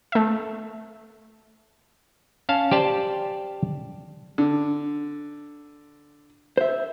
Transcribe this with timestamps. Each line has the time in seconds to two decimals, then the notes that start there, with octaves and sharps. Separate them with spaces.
0.12 A3 E5
2.49 C#4 F5 A5
2.71 G4 C5 D5 A5
4.38 D3
6.57 C5 E5